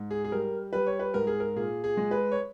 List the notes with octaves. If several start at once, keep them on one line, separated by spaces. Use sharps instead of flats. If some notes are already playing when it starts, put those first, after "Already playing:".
Already playing: G#2
G#4
G#4
G3 A#4
G3 B4
C#5
B4
G#2 A#4
G#4
A#4
A#2 G#4
G#4
G#3
B4
C#5